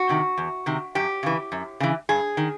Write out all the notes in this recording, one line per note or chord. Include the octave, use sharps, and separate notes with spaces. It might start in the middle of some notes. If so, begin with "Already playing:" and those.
Already playing: F#4
C3 D#3
E2
C3 D#3
F#2 G4
C#3 E3
F#2
C#3 E3
G2 G#4
D#3